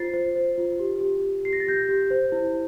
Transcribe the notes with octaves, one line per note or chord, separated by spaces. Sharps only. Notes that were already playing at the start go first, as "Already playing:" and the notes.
Already playing: F4 C5 A6 C7
C5
C5
F4
G4
G4
G4
G4 C7
A#6
A6
G4 G6 A#6
G4
C5
E4